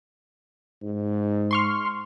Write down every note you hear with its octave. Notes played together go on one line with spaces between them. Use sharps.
G#2
C6 C#6 F6